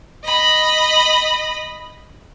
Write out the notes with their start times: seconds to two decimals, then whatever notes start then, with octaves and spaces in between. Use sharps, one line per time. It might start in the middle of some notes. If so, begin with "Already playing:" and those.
0.25 D#5 B5